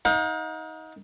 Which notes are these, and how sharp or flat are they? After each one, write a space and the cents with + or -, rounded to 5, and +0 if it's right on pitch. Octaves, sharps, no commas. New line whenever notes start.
D#4 +25 F5 +45